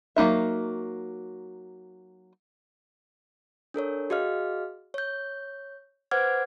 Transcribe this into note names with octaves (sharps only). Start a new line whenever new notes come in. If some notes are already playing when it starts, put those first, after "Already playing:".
F#3 A#3 D#4 E5
D4 A4 A#4 C#5
F#4 G#4 D#5 F5 F6
C#5 G6
B4 C5 F#5 D6 F6 G#6